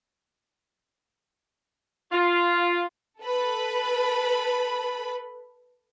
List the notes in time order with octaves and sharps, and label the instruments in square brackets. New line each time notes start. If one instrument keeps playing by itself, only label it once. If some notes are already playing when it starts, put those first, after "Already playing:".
[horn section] F4
[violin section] A4 B4 B5